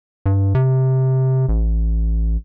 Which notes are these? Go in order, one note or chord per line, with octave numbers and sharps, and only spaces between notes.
G2
C3
A1